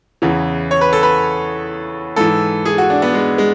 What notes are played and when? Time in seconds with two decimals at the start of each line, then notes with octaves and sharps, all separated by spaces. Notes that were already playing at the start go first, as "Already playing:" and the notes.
0.22 E2 C#3 E3
0.71 C#5
0.81 B4
0.93 A4
1.03 B4
2.16 G#2 E3 A4
2.65 G#4
2.78 F#4
2.90 D4
3.02 B3
3.14 G#3
3.38 G#3